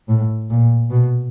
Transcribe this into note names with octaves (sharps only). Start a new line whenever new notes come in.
A2
A#2
B2